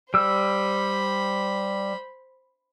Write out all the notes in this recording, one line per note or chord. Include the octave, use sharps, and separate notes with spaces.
G3 C5 B5 E6